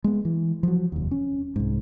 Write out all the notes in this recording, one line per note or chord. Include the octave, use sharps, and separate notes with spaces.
G#3 B3
E3
F3 F#3
F1 D#2
C#4
C2 G#2